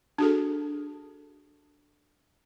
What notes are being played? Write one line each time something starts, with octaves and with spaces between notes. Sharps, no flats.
D4 F#4 G#4 A4